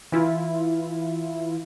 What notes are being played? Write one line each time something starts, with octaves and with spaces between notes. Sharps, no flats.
E3 E4 F4